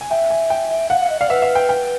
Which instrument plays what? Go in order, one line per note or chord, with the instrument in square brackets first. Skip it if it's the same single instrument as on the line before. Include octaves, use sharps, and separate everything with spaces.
[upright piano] G#5
[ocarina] E5 [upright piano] G5
[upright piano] G#5
G5
[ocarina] F5 [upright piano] F#5
[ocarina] F5
D#5
[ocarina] D5 [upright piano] F5
[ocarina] B4 [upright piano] E5
[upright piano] E5
G5
G5